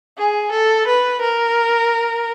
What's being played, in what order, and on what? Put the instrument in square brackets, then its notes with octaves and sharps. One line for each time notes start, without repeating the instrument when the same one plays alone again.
[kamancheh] G#4
A4
B4
A#4